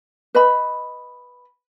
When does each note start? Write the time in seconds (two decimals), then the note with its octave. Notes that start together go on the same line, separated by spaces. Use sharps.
0.35 B4 D#5 B5